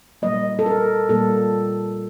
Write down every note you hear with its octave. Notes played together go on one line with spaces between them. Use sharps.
A#2 G3 A#3 D#5
A4
A#4
A#2 G3 A#3 A4